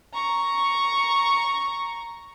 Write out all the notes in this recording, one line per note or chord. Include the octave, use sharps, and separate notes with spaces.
A#5 C#6